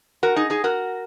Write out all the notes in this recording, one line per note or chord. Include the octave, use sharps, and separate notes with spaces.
F#4 A#4
D#4 G#4
D#4 G#4
F#4 A#4